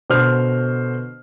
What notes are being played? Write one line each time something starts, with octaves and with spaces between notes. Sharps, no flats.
B2 D3 C5 F6